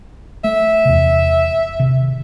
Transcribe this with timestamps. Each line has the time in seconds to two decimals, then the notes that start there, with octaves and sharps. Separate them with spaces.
0.44 A3 E5
0.85 E2 C3
1.80 C3 D#3